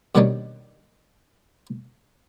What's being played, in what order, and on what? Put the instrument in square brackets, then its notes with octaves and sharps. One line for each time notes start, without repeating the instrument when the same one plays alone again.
[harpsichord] B2 D#3 G3 A#3 C#4 D4